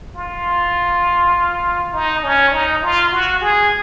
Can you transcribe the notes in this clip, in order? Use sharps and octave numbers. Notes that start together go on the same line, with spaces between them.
F4
D#4
C#4
D#4
F4
F#4
G#4